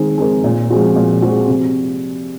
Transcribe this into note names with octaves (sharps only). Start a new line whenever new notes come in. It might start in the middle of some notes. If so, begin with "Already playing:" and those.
Already playing: D#3 G#3 C4 D#4
G#3 C4 D#4 A#4
A#2
F3 G#3 C4 F#4
A#2
F3 G#3 C4 F#4
C3